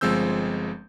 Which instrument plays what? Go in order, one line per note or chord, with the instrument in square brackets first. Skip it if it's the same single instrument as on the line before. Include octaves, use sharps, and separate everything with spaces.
[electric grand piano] G1 F3 G#3 C4 E6 G6